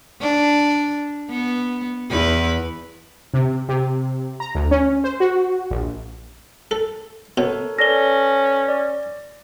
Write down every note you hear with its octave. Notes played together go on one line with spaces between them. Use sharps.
D4
B3
E2 B4
C3
C3
A#5
D2
C#4
C5
F#4
A#1
A4
B2 A4 A#4 C#5
C#4 A4 B4 D5 A#6 G7
D5